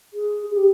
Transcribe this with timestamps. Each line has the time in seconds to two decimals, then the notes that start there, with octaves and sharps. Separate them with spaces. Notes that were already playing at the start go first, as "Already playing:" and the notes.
0.13 G#4
0.51 G#4
0.56 G4